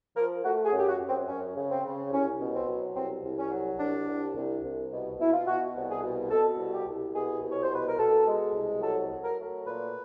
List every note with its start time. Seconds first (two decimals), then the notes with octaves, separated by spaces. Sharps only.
0.16 F3 A#4
0.44 A3 F#4
0.65 G#4
0.72 F#2
0.79 G4
0.87 F#4
1.00 F#2
1.08 C4
1.28 F#2 C#4
1.55 C#3
1.71 C4
1.85 C#3
2.12 C2 C#4
2.40 B2
2.54 C4
2.68 F#3
2.96 C2 C4
3.23 C2
3.38 C#4
3.51 F#3
3.79 C2 D4
4.08 C2
4.35 C2
4.63 C2
4.91 B2
5.19 B2 E4
5.33 F4
5.47 B2 F#4
5.75 C2
5.89 G#4
6.02 B2
6.30 B2 A4
6.58 C2
6.72 G4
6.87 C2
7.14 B2 G#4
7.42 C2
7.51 C#5
7.63 C5
7.70 B2 B4
7.87 A#4
7.98 B2 A4
8.26 G#3
8.53 C2
8.81 F#3 A4
9.09 F#3
9.23 A#4
9.38 A3
9.65 A#2 B4